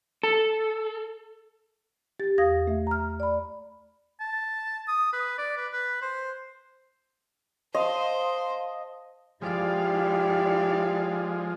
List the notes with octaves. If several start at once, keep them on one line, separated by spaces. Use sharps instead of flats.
A4
G4 A6
E2 F5 D#6 G#6 A#6
A3 E5
A#5 F6
D5 B5
A5
D#6
B4
D5
B4
B4
C5
C5 D#5 F5 A5 C6
F3 G#3 E4 G4 D5 F5